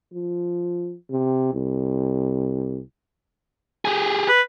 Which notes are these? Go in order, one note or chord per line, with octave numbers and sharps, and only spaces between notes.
F3
C3
C2
G4 G#4
B4